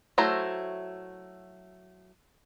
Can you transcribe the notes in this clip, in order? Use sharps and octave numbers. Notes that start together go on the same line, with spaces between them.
F#3 A3 E4 C5 A#5